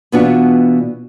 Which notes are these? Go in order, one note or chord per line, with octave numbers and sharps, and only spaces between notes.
B2 E3 B3 D4 F4 F#4